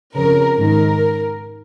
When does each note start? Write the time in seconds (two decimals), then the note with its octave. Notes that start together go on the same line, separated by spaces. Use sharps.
0.14 F2 C#3 A#4
0.57 G#2 D#3 A#4